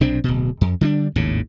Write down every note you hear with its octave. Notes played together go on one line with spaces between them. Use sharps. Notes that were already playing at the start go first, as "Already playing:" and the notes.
B1 C3 C4 D4
D1 B2
F2
D3 G3 B3 D4
G#1 D#2 A2 C#3